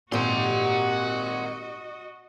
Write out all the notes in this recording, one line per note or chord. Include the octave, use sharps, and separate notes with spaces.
G#1 A#2 D#4 F#4 G4 D#5 F#5 C6